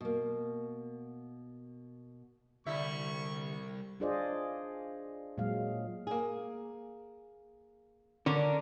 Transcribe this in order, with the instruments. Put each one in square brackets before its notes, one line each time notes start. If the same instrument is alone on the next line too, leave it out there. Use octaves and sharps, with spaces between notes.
[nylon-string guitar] B2 A#3
[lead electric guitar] C2 [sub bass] D3 [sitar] G3 E4 E5 [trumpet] C#6
[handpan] D4 F4 G#4 C5 D5 D#5
A#2 F#3 G#3 F5
[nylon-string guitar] A#3 G#4
[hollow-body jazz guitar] D3 [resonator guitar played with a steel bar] C#4 D4 A#4 [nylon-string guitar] A4